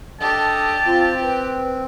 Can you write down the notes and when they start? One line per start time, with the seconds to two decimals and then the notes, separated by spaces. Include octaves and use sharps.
0.21 D4 G4 A4 D#5 A5
0.86 C4 F4
1.22 B4